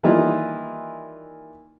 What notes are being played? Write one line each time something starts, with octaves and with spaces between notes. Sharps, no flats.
D#3 E3 G3 A#3 E4 F4